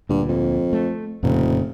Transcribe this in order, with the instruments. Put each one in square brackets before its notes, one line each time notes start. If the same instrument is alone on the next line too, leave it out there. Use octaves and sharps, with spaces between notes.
[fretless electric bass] D2 A#2 [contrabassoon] G2
[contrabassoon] F2
[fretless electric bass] A3
[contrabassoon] F1 [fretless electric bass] F2 A#2 C#3